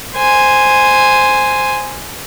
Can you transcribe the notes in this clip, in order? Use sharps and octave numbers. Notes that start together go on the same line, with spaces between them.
C5 G#5